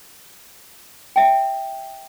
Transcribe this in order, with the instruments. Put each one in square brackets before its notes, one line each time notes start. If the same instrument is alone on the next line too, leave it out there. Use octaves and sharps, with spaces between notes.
[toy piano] E5 G5